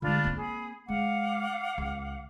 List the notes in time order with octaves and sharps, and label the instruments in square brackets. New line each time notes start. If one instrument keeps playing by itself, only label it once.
[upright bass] D3 G#3 [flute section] D4 F4 B5
[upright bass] A#3 C4
[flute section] G#4 B5
[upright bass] G#3 [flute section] F5 F#5 D6
[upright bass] C#2